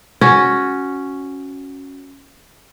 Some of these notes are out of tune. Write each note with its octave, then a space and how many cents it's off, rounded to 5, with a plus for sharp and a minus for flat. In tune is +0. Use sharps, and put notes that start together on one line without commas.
C#4 +0 F#4 +0